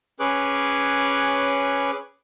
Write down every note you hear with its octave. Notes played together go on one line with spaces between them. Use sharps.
C#4 G#4 B4 C#5 D6 F#6